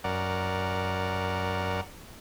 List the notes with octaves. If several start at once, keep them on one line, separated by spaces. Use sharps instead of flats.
F#2 A#4 D5 F#5